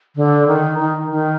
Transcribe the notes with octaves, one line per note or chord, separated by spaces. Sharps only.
D3
D#3
D#3
D#3